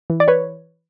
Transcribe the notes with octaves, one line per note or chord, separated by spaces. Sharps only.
E3
D5
B4 C#5